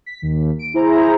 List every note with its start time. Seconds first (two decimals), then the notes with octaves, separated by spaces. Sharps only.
0.06 B6
0.22 D#2
0.59 D7
0.74 E4 G#4 C5 A#5